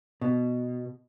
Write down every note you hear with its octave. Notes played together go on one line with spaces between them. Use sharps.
B2